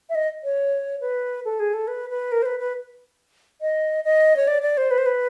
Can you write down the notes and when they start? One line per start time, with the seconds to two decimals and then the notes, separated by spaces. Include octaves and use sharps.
0.09 E5
0.15 D#5
0.44 C#5
1.01 B4
1.45 A4
1.60 G#4
1.74 A4
1.88 B4
2.10 B4
2.32 A#4
2.42 C5
2.46 B4
2.60 B4
3.61 D#5
4.05 D#5
4.36 C#5
4.48 D5
4.62 D5
4.77 C5
4.91 B4
4.98 C5
5.06 B4